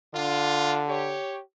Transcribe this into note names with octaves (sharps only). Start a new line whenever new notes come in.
D3 D4 F4
G4 C#5